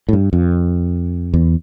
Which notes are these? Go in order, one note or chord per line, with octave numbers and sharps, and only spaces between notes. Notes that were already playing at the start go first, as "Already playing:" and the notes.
A2
G2
F2
E2